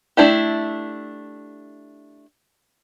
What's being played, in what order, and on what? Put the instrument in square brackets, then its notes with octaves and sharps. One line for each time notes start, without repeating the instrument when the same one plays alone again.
[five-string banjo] A3 D4 E4 G4